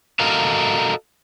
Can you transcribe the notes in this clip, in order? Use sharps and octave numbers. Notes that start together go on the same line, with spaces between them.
F#4 A4 A#4 D#5 F5